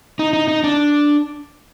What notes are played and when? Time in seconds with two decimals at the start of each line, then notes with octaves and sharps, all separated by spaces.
0.19 D#4
0.33 D#4
0.48 D#4
0.64 D4